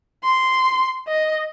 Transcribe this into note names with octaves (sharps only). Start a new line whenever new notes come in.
C6
D#5